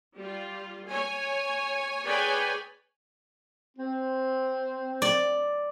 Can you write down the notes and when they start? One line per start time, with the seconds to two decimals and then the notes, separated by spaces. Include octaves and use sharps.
0.16 G3 F4
0.88 C#5 G#5
2.04 G#4 B4 C#5 D5 G5 G#5
3.77 C4
5.02 D5